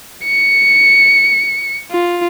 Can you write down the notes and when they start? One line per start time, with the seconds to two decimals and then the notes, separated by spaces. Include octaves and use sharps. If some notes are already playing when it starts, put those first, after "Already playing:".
0.25 C#7
1.91 F4